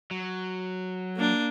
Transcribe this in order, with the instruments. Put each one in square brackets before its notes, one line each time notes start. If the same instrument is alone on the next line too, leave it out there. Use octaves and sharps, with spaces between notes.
[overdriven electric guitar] F#3
[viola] A#3 D4